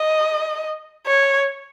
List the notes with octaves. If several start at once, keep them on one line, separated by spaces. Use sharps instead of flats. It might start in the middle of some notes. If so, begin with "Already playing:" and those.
Already playing: D#5
C#5